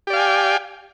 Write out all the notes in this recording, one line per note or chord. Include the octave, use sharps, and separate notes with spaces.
G4 D5 F5 G5 G#5